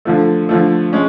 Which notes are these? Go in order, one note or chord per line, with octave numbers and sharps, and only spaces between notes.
D3 F3 A3
D3 F3 A3
G#3 C#4